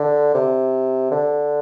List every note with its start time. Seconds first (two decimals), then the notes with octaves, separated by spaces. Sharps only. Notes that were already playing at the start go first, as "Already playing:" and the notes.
Already playing: D3
0.34 C3
1.11 D3